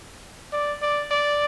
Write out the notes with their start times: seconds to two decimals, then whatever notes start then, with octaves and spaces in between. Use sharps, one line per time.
0.53 D5
0.82 D5
1.11 D5